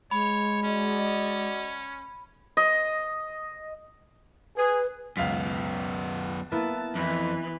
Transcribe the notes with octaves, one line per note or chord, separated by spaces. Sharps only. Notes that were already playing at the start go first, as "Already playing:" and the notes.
G#3 C#5 B5
C#4 F#4 D5 D#5
D#5
G#4 B4
C#2 F#2 B3 F5 B6
A#3 B3 E4 B4 A5
F2 E3